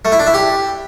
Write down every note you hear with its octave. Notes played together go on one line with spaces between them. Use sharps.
A3
E4
D4
E4
G4